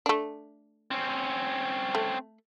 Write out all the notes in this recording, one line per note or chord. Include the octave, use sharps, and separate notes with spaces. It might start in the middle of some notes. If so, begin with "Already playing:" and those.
A3 D4
C4 C#4
A3